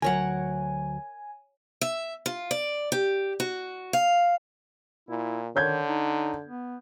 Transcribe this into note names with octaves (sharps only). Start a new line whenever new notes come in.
D2 F#3 A#4 C#5 F#5 G#5
E5
F4
D5
G4
F#4
F5
A#2 E4
D3 D#3 C#5 G6 G#6
D#4
B3